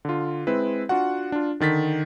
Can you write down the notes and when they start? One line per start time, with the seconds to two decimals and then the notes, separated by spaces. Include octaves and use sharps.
0.05 D3 F4
0.47 G#3 C4 E4 B4
0.89 D4 F4 F#4 F#5
1.32 D4 F4
1.60 D3 D#3 A6 B6